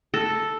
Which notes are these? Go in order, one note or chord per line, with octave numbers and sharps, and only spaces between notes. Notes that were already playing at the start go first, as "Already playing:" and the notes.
A4